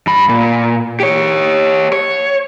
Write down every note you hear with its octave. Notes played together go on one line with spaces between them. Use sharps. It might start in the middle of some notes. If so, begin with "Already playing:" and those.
G2 B5
A#2
G4 C#5
C#5